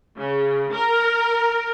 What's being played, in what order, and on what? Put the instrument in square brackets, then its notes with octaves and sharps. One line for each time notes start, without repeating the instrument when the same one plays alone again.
[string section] C#3
A#4